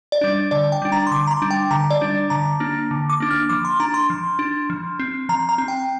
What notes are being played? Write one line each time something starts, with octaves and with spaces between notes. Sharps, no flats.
D5
G3 D4
D3 D5
G5
G3 D4
A#5
C6
D3 D6
A#5
C6
G3 D4
G5
D3 A#5
D5
G3 D4
D3 A#5
A#3 D4
D3
D6
A#3 D4
F6
F3 D6
C6
D4 A#5
C6
F3
D4
F3
C4
F3 A#5
A#5
C4
G5